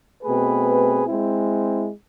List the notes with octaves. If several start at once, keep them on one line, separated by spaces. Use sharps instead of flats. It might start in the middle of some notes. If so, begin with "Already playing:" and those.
B2 A3 C4 G#4 B4
G#3 C4 E4